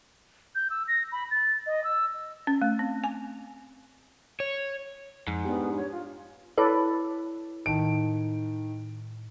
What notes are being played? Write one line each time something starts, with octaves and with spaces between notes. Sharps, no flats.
G6
E6
A#6
B5
A6
D#5
E6
C#4
A3
C4
G#5
C#5
F2 G#2
B3 D4 G4
C#5
F4
E4 A4 B4 C#5 D5
A2 D#3 A5 D7